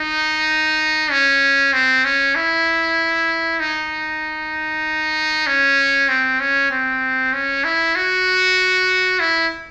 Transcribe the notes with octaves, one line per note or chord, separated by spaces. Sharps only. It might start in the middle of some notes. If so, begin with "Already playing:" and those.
Already playing: D#4
C#4
C4
C#4
E4
D#4
C#4
C4
C#4
C4
C#4
E4
F#4
E4